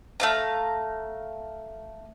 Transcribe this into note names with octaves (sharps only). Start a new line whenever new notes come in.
A3 F5 A#5